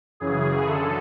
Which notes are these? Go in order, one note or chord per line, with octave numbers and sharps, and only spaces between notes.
F#2 C#3 E3 G#4
F#2 D3 A4